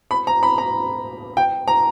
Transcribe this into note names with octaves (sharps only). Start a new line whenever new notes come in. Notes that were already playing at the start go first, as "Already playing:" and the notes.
B5
A#5
B5
A#5
G5
A#5